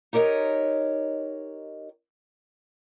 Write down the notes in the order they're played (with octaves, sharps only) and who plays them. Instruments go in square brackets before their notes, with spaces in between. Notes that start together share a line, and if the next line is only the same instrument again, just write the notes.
[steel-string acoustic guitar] D#4 G4 A#4 C#5 D#5